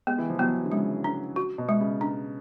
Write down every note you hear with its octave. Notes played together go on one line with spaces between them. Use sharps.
G#3 B3
E3
F3
F#3 B3
D3
C#3 G#3
D4
F#4
B2
G#3
C#3
D4